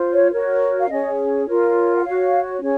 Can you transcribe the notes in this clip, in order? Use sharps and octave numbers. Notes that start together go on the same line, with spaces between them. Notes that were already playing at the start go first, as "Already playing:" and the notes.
Already playing: F4 C5
C#5
F#4 A#4 C#5
F5
C#4 G#4 C#5 D#5
F4 A#4 C#5
F#5
F#4 C#5 F5
C#4 G#4 C#5